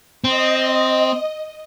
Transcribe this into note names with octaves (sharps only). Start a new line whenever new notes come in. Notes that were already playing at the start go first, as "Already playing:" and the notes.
C4 D#5